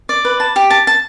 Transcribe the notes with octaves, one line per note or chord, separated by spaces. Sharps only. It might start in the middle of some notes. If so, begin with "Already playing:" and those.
D5
B4
A5
G4
A5
A5